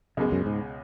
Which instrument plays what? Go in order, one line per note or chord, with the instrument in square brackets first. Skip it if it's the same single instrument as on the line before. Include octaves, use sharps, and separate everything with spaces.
[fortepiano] C#2 B2 G#3 [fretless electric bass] F#2
[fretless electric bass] F#2
G#2